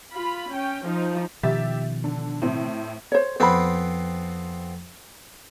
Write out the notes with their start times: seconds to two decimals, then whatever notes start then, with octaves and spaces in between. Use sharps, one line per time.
0.12 F4 B5
0.51 C#4 G5
0.85 F3 D#4
1.43 B2 D#3 F3 G4 E5 A6
2.04 D3
2.42 A2 C4
3.12 C5 C#5
3.40 F2 B3 C4 C5 B5